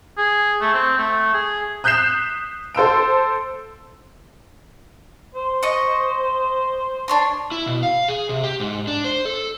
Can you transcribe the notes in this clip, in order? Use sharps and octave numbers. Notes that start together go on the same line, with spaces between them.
G#4
A3
C4
A3
G#4
D#6 F#6 G6 B6 C7 E7
A4 C5 E6 D7
C5
D#5 C#6
D4 C#5 C6
E4
B2
F5
G#4
C3
G4
G#2
D4
C5
A4